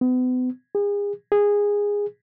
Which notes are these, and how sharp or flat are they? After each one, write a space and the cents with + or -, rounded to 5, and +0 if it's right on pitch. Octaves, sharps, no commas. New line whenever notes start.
B3 +40
G#4 -35
G#4 -15